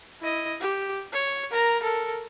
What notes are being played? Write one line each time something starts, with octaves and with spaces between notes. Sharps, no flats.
E4 D#5
G4
C#5
A#4 A#5
A4 A#4